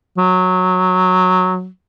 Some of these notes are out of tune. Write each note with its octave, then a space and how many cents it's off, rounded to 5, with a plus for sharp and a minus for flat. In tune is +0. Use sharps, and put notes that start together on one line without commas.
F#3 -10